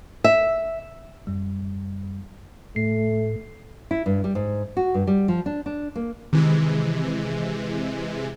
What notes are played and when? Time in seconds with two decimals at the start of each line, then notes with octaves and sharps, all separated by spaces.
0.24 E5
1.27 F#2 G3
2.76 A2 A3 C7
3.91 E4
4.06 G2
4.24 G3
4.35 G#2
4.77 F#4
4.94 G2
5.07 G3
5.28 F3
5.46 D4
5.66 D4
5.95 A#3
6.33 C3 D#3 E3 G#3